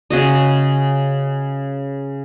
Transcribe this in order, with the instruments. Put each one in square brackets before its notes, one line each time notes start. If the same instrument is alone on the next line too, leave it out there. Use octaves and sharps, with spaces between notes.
[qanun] C#3 F#4 D#5